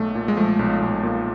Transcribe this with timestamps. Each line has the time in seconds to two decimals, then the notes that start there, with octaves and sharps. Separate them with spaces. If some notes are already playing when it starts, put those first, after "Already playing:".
Already playing: B1 A3
0.15 A#2
0.28 G#3
0.37 F3 A3
0.59 B1
0.81 B1
1.03 A#2